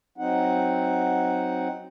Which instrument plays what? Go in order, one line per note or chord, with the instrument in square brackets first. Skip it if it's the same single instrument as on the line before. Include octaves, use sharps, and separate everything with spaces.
[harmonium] F#3 C4 D#4 F#5